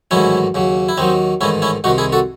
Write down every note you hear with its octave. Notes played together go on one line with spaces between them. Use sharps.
A1 G#2 D#3 F#3 C#4 E4
D#2 C#3 F#3
E4
D#2 D#3 F#3 C4 D#4
A1 G#2 D#3 C#4 E4
C#4 E4
C2 C3 D#3 D#4 F#4
E4 G#4
F#4 A4